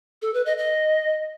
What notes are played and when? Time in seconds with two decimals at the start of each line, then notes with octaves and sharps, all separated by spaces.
0.22 A4
0.34 B4
0.46 D#5
0.58 D#5